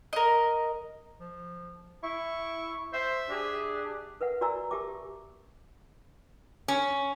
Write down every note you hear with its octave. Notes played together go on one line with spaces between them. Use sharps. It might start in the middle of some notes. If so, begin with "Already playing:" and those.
A#4 D#5
F3
E4 C#6
C5 E5
D4 G4 G#4
A#4 B4 E5 F#5
F#4 A#4 D5 G#5 A#5 E6
G4 A#4 E5 A5 D6
C#4